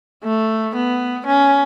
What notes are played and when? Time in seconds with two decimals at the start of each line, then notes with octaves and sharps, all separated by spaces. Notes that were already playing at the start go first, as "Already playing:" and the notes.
0.24 A3
0.76 B3
1.27 C#4